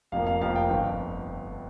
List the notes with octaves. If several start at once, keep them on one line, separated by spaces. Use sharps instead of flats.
F1 F2 F3 A#3 F5
F5
F1 F2 F3 A#3 F5
G5
G1 F2 D3 F5